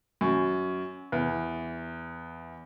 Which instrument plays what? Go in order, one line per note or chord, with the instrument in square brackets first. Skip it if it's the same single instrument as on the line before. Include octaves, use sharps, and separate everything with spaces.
[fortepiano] F#2
E2